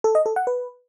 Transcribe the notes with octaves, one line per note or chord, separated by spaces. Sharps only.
A4
D#5
A4
F#5
B4